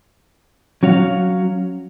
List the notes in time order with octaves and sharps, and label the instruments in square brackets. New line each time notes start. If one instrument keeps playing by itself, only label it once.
[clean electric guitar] F#3 C#4 F#4 C#5 F5